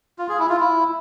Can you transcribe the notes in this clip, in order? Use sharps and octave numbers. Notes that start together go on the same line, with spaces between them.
F4
G#4
E4
F4
E4